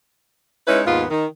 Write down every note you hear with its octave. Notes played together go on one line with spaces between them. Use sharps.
G#3 C#4 D#4 E4 B4
D#2 G#2 B3 F4
D#3